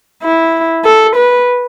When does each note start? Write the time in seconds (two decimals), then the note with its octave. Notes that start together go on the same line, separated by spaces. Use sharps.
0.23 E4
0.85 A4
1.16 B4